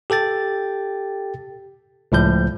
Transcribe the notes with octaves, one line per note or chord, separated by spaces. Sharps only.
G4 A4 G5 A6
C#2 A2 F3 G6